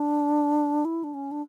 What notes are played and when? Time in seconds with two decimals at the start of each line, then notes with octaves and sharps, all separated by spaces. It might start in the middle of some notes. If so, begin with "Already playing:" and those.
Already playing: D4
0.85 E4
1.04 D4
1.14 C#4
1.31 D4